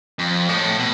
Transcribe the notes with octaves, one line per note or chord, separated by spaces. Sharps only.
F2
A2
B2